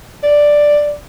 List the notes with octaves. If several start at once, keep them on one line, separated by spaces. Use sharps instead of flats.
D5